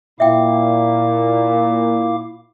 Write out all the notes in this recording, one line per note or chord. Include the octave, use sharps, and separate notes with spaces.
A#2 E4 E5 F5 G5 D6